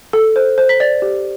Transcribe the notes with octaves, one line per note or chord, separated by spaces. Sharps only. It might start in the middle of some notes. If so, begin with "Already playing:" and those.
A4
C5
C5
B6
D5 A6
G4